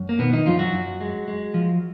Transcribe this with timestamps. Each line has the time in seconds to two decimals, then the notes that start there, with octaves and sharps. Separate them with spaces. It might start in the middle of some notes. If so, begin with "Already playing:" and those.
Already playing: F#2
0.09 A#3
0.19 B2 D#3 B3
0.33 D#3 D#4
0.46 F#2 F3 F4
0.59 F#3 F#4
0.73 F#2
1.01 G#3
1.28 G#3
1.54 F3